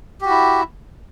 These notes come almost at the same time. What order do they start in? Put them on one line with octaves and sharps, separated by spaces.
G4 F#4 E4